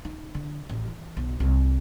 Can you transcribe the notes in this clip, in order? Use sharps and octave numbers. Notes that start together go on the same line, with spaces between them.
D#4
D3
A1
E3
B1
C2